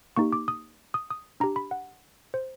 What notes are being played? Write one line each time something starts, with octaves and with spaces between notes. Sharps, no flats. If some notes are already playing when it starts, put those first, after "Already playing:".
A#3 D#4 G4 C#6
D6
D#6
D#6
D#6
D4 G4 A#5
B5
F#5
C5